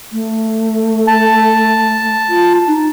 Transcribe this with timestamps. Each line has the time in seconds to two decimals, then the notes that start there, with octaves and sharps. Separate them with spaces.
0.12 A3
1.07 A5
2.29 F4
2.67 D#4